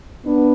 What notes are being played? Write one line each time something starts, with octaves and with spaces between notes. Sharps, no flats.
B3 D4